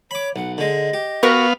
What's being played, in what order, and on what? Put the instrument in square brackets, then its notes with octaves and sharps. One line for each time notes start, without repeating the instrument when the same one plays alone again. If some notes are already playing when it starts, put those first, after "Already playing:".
[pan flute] C#5 [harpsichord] B5 D6
[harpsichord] B1 [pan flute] F#5
[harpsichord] D3 G#3 [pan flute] D#5
[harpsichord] G4
[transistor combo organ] B3 F5 [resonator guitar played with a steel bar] F#4 A#4 B4